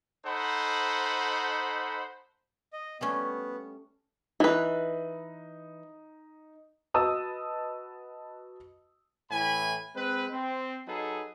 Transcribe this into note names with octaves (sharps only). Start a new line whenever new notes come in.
D#4 A4 C5 F#5 B5
D#5
G3 A3 B3 C#4
E3 D#4 B4
F#4 B4 D#5 A5 D#6 E6
A2 E3 G#5 B5
G#3 C4 B4
C4
F#3 D#4 G#4 A4 B4